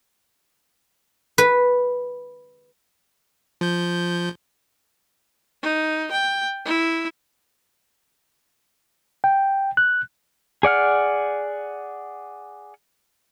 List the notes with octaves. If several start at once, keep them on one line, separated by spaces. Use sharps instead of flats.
B4
F3 G6
D#4
G5
E4
G5
F#6
G#4 D5 F#5 F6